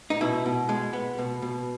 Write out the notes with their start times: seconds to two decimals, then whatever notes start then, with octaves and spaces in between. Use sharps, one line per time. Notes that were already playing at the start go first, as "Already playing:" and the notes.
0.10 D#4
0.21 B2 E4
0.46 B2
0.69 G#3
0.93 B3
1.18 B2
1.42 B2